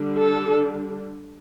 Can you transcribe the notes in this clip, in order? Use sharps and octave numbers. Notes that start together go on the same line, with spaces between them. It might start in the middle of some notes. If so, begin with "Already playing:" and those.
Already playing: D3 G3 D4
A4